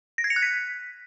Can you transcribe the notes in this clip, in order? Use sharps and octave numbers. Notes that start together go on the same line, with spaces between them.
A#6
G#6
C#7
F#6
B6